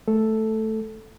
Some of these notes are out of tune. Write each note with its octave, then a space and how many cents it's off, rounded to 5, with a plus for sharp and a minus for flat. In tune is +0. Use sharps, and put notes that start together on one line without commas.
A3 -5 A4 +0